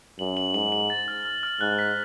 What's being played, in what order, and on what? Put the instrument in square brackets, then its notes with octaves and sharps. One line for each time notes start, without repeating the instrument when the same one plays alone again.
[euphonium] F#2 [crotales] F#7
[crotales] F#7
[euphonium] G#2 [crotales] F#7
[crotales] F#7
A6
F6
F6
F6
[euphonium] G#2 [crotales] F#6
[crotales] B6